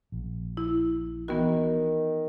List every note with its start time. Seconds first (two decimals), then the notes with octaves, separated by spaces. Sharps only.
0.12 A#1
0.57 E4
1.28 D#3 E3 B3 F#4